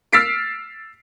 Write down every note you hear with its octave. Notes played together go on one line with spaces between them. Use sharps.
E6 F6 A6 B6 C7 D7